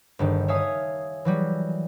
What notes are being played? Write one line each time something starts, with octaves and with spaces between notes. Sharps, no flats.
G1 G2 D#3
C#5 E5 F5 G#5 D#6
E3 F#3 G3